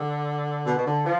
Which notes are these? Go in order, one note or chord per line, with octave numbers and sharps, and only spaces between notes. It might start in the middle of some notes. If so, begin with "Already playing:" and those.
Already playing: D3
B2
B2
D3
F3